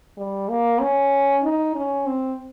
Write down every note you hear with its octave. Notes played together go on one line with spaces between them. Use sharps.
G3
A#3
C#4
D#4
C#4
C4